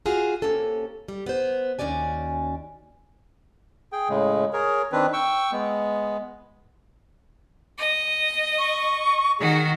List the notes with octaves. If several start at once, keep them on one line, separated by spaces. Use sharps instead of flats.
F4 F#4 G#4 F5
C3 A#3 C#4 A4
G3
B3 C5
D#2 D#3 C#4 F#4 D5 G#5
G#4 G5
A2 C#3 G#3
G#4 A#4 C#5
D#3 C4 D4 B4
G5 C#6 E6
G#3 B3
D#5
C#6
D#3 F#4 G#4